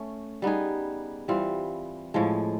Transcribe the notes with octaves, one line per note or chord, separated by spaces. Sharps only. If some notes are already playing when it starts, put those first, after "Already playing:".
Already playing: A3 C#4
G3 B3 D#4 G#4
E3 G3 C4 F4
A2 F3 G#3